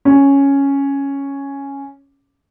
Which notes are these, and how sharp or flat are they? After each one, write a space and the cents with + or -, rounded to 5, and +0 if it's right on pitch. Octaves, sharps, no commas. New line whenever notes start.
C#4 +0